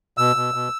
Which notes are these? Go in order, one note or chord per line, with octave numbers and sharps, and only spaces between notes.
B2 E6
B2
B2